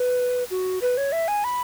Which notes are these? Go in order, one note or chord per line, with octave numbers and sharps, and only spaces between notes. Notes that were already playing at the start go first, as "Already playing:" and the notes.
Already playing: B4
F#4
B4
C#5
E5
G#5
B5